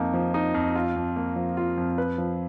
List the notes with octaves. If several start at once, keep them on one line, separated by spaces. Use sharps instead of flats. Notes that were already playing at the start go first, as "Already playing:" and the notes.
Already playing: F2 A#3 D#4
F3
D#4
F2
F4
F2
A#3
F3
F4
F2
B4
F3